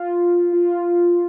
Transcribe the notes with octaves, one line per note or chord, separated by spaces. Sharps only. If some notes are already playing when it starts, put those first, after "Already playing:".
Already playing: F4
F4